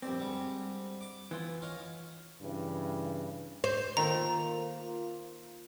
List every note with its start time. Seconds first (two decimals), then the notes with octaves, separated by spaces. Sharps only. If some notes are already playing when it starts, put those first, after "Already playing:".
0.02 A#1 G2 C4 D5
0.19 D3 G3 G#3
1.01 D6
1.31 E3 B3 F4
1.62 C#4 D#5 F5
2.41 G2 C#3 E3
3.64 C5
3.97 D#3 A3 A#3 F4 A#5